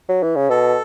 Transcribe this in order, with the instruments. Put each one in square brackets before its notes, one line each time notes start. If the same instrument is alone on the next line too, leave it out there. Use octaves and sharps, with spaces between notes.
[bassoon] F#3
E3
C#3
[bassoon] B2 [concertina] A4